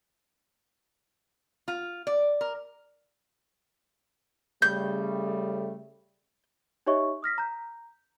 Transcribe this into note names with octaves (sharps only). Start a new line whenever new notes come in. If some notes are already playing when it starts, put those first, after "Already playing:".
F4
D5
A#4
C#3 G3 A3 G6
D#4 G4 C#5 D#5 E5 C#6
D#6 F6 A#6 B6
A#5 G6